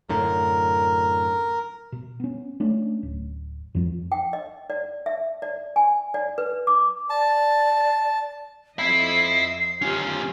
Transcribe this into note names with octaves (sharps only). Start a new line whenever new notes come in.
F#2 A2 D3 A#4
B2
B3 C#4
A3 C#4 D4
D1
F2 F3
G5
D#5
D5
E5
D5
G#5
D5
B4
D6
D5 A5
F2 D#5 E5 B5 C7
B1 D3 C#4 F4 G4